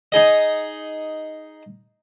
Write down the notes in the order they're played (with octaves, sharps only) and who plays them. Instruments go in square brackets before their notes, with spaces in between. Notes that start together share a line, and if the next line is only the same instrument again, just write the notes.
[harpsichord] D#4 G#4 D#5